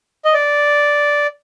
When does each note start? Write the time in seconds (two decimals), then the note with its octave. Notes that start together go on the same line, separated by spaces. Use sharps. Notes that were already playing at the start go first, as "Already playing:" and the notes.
0.25 D#5
0.34 D5